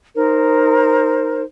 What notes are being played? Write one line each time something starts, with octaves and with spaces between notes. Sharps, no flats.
D#4 A#4 C5